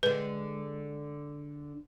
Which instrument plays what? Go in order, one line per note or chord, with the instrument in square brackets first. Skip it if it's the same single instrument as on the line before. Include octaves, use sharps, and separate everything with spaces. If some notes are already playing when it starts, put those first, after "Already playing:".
[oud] D3 G#3 [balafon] B4